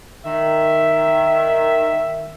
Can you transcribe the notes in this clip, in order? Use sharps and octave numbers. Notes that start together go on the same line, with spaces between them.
D#3 E5